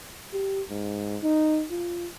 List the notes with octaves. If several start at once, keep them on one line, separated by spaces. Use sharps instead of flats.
G4
G#2
D#4
F4